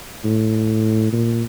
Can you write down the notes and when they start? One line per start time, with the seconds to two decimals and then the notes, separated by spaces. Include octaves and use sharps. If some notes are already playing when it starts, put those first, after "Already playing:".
0.25 A2
1.13 A#2